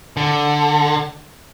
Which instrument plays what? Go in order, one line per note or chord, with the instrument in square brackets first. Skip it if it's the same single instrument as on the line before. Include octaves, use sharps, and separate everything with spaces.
[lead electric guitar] D3